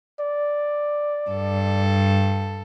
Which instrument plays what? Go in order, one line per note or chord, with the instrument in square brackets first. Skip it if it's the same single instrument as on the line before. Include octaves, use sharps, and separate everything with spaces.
[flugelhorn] D5
[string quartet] G2 A4